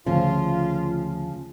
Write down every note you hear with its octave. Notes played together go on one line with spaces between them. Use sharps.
D2 C#3 F3 F4